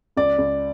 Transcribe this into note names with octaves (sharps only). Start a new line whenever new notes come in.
C#2 D5
C#2